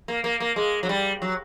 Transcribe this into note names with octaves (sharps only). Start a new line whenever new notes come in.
A#3
A#3
A#3
G#3
F#3
G3
F#3